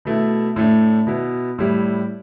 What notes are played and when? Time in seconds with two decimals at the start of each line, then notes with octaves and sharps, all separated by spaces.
0.05 B2 A3 E4
0.56 A2 A3 D4
1.07 B2 B3 E4
1.58 A2 G3 E4